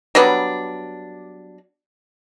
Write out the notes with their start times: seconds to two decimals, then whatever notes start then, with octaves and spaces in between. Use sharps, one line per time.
0.15 F#3 G3 B3 D4